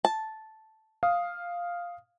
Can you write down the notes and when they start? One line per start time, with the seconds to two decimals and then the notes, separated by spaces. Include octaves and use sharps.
0.05 A5
1.03 F5 D#6